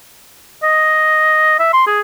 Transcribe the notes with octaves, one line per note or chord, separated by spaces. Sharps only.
D#5
E5
C6
G#4